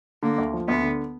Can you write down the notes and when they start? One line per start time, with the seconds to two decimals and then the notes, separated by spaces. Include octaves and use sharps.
0.23 D3 A#3
0.38 D2
0.54 F3
0.68 D2 B3
0.83 D3